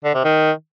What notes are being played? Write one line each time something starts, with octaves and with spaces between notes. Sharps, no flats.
D3
C3
D#3